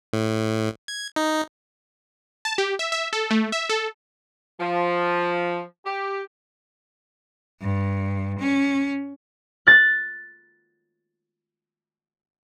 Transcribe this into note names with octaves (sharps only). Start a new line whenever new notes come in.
A2
G#6
D#4
A5
G4
E5
E5
A4
A3
E5
A4
F3
G4
G2
C#4
F#6 A6